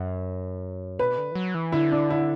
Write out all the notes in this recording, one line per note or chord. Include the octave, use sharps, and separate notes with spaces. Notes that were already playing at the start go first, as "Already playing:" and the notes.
Already playing: F#2
B2 B4
D3
E3
F#3
E3
D3 E4
D4
E4